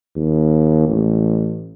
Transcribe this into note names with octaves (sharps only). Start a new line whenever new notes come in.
D#2
A1